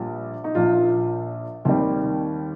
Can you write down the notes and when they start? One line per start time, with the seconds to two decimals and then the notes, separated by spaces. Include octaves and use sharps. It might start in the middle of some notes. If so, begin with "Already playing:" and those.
Already playing: A#1 A#2 G3
0.44 D#4
0.55 A#1 A#2 F3 F4
1.65 D#2 D#3 G3 C4